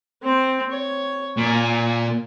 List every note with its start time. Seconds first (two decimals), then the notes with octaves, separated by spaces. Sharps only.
0.23 C4 C5
0.70 C#5
1.37 A#2 G#5